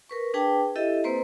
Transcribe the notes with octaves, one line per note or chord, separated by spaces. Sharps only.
A#4 B4 C#6
D4 G#4 B4 G5 A5
E4 G4 A4 D#5 E5
A#3 C4 B4 C5 A#5